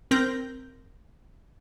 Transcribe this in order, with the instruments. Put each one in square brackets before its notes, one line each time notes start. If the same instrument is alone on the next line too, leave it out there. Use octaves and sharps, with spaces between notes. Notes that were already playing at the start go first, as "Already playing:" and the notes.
[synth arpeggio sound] C4 A#4 G6 A#6